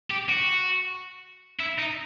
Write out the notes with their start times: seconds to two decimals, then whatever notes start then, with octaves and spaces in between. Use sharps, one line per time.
0.11 G4
0.29 F#4
1.60 E4
1.79 D#4